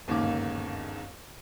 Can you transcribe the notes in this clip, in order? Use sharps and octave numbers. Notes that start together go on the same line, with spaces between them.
G1 D#2 G#2 C#3 A#3 D6